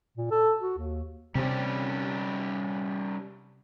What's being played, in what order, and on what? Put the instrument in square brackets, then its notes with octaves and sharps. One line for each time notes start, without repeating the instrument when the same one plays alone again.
[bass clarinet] A#2
A4
F#4
D#2
[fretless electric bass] C3 C4 [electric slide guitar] G3 C#4 D5